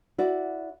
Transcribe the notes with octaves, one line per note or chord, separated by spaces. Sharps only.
E4 F#4 D5